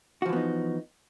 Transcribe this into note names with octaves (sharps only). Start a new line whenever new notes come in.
E3 F3 B3 D#4 F#4